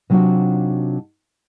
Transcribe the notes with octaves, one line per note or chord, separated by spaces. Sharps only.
C3 F#3 D4 D#4 F4 F#4